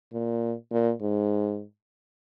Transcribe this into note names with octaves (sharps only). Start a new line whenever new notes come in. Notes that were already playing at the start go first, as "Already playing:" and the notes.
A#2
A#2
G#2